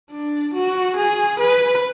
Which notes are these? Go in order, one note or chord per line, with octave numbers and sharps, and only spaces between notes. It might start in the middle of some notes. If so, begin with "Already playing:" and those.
D4
F#4
G#4
B4